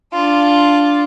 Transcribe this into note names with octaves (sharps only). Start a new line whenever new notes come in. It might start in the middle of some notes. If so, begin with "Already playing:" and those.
D4 F4